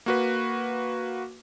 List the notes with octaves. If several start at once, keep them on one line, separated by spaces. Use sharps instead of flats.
A#3 F#4 B4